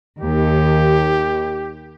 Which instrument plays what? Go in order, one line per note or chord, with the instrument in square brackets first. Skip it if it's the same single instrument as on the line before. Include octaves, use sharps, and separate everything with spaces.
[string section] D#2 [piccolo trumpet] G4